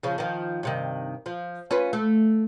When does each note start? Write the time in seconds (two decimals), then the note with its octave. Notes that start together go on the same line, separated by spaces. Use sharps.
0.03 C#3 F3
0.18 D#3 F3
0.63 G2 C3 D#3
1.26 F3
1.71 C#4 F4 B4
1.93 A3